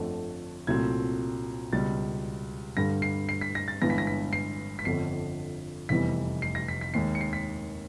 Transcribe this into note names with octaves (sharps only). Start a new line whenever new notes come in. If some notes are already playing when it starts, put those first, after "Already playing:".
Already playing: G1 F2 D3 F3 A3
C2 A#2 F#3 A3 C4 G#6
C#2 B2 G3 A6
G2 D3 G3 A#6
C7
C7
B6
A#6
A6
G1 G2 E3 G#3 B3 A#6
B6
A#6
B6
C7
B6
G1 F2 D3 C7
F1 E2 C3 E3 G3 B6
C7
A#6
B6
B6
D#2 D#3 G#3 C7
C#7
C7
B6